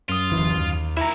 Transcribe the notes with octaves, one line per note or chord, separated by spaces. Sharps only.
F#2 F4 D#6
D1 E3
D#2
D#3 E4 E5 A#5